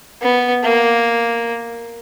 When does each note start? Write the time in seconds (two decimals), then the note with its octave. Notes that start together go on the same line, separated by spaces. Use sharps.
0.21 B3
0.63 A#3